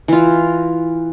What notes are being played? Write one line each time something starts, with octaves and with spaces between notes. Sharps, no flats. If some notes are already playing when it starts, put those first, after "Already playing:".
E3 F4